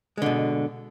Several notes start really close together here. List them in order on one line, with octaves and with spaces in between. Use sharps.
G#3 D3 B2